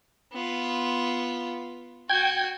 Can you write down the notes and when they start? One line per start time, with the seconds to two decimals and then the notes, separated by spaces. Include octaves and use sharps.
0.33 B3 F4
2.10 F#4 G5 G#6